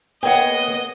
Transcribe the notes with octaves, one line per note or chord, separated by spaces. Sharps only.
A#3 B3 G#4 B4 C#5 D#5 F#5 G5